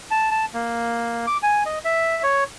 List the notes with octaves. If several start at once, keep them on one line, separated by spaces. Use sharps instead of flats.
A5
A5
A#3
D6
G#5
D#5
E5
C#5